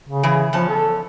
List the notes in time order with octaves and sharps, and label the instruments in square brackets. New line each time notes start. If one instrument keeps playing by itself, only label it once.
[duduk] C#3
[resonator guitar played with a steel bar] E3 G#4
[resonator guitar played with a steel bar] E2 C#4 A5 [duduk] F3
[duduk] A4